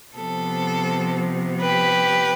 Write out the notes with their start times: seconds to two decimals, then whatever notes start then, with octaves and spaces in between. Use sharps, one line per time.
0.16 C3 F3 B3 A4
1.62 G4 B4